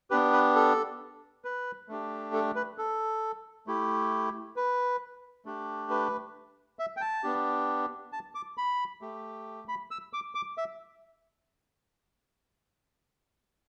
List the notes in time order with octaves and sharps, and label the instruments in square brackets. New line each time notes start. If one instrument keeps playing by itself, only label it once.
[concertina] B3 D4 G4 B4
B4
A4
B4
A3 D4 G4
A4
B4
A4
A3 E4 G4
B4
A3 D4 G4
B4
E5
G5
A5
B3 D4 G4
A5
D6
B5
A3 G4
B5
E6
D6
D6
E5